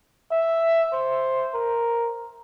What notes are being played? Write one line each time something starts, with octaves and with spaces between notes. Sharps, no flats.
E5
C5
A#4